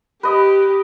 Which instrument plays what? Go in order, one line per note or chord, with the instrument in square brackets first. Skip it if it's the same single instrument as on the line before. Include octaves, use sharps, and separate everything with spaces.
[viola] G4 [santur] B4 D#5